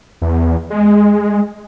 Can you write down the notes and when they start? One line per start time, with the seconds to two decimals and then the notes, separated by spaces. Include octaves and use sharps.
0.22 E2
0.70 G#3